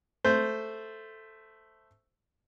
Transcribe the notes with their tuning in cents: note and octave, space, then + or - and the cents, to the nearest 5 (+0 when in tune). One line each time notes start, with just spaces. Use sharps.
A3 +0 C5 -10